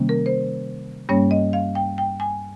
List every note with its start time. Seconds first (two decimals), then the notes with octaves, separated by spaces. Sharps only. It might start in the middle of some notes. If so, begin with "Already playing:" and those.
Already playing: C3 D#3 G3 A#3 C#4
0.09 A#4
0.26 C5
1.09 G2 G3 A#3 C#4 C#5
1.31 D#5
1.53 F5
1.75 G5
1.98 G5
2.20 G#5